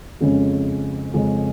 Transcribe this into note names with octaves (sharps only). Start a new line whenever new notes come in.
F2 C#3 G#3 C#4
F2 C#3 G#3 C#4